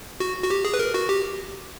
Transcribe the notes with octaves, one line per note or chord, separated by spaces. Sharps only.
F#4
F#4
G4
G#4
B4
A#4
F#4
G4